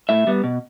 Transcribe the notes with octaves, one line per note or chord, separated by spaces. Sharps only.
A2 E5
G3 B3
B2